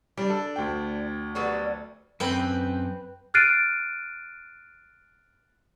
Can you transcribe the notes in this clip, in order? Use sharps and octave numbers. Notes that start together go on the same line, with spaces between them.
G3 D4
A4
D2 G5
F#3 G3 B3
F#2 C4 B4 G5
F6 F#6 A6 C7 D7 D#7